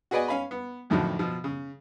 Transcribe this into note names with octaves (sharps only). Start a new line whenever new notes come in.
F#4 G#4 B4 D5 D#5 G#5
C#4 F5 G#5 B5
B3
F2 A2 D3 D#3 F3 F#3
B2 F3
C#3